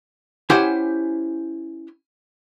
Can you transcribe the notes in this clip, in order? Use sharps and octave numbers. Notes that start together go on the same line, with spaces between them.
C#4 E4 G4 C5 F#5 G#5